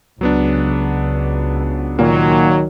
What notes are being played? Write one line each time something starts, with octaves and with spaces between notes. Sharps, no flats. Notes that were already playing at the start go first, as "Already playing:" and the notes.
C#2 F#3 B3 D4
A#2 D#3 F#3 A#3